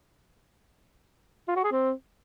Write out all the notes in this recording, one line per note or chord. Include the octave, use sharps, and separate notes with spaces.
F4
F#4
G#4
C4